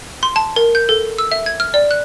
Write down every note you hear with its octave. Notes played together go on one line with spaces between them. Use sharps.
C6
A5
A#4
G6
A4
E6
E5
G#6
F6
D5
F#6